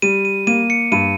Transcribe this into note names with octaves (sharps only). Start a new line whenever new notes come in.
G3 D#7
D#7
A#3 D#7
C#7
G2 D#7